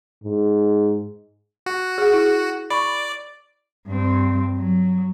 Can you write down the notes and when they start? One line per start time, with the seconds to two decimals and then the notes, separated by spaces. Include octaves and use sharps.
0.24 G#2
1.66 F#4
1.98 G#4 F#5
2.13 E4 G#4
2.70 D5 B5 C#6
3.88 G2 C4
4.56 F#3